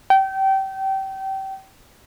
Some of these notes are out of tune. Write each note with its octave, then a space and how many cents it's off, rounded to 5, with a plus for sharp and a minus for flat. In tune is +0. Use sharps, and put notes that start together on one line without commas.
G5 -25